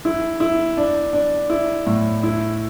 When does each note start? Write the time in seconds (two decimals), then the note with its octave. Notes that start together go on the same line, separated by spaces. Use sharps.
0.05 E4
0.40 E4
0.77 D4
1.13 D4
1.50 E4
1.86 A2
2.23 E4